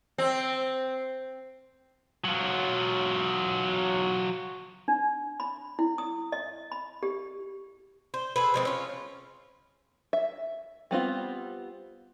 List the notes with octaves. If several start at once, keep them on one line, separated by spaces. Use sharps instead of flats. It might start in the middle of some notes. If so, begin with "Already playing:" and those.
C4
F#3 F4
D4
B5
E4
D#6
D#5
B5
G4
C5
G#4 A4 B4
F3 G#3 C4
C#4 F4
E5
G3 B3 C4 F4